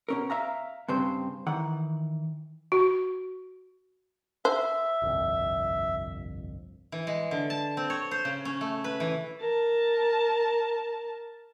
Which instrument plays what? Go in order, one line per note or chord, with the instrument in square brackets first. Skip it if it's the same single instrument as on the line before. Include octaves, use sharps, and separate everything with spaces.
[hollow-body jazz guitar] B2 C#4 A#4
E5 F5 A#5
G2 C#3 C4 C5
D#3 E3 F#5
[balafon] F#4
[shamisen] C5 [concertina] E5
[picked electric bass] G1 C2 F2
[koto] E3
G#3
D3
A5
C4
C#5
C5
C#3
C#4
A3
B4
E3
[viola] A#4 A5